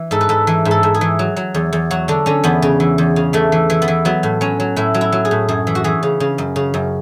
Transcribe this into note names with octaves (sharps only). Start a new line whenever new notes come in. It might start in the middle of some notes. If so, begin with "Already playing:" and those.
Already playing: E3
G#2 A4
B4
G#2 A4
E3
G#2
A4
G#2
G#4
E3
F#3
F#3
E2
E2
F#3 F#4
D3 D4
D3 C#4
E2 B3
C#3
E3
E2
C#3
E3 A3
E3
E3
B3
E3
F#3 B3
A2
F#3 C#4
F#3
A2 E4
F#3
E4
F#3
G#4
A2
F#2 G#4
E3
F#4
E3 G#4
C#3
C#3
F#2
C#3
F#2